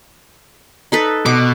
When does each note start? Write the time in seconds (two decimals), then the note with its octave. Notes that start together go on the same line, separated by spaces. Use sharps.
0.92 D#4 A4 B4
1.26 B2 D6